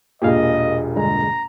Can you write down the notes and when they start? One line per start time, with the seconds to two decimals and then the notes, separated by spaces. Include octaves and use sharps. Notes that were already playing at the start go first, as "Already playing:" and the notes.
0.22 E1 A#2 G4 G#4 D#5 F5
0.96 G2 D3 G#3 A#5